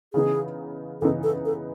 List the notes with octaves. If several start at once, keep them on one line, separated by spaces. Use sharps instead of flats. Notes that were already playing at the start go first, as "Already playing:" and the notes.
C#3 E3 B3 D#4 G#4
C#3 E3 B3 D#4 A4
A4
A4